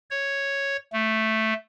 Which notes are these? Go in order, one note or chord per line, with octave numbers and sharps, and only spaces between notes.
C#5
A3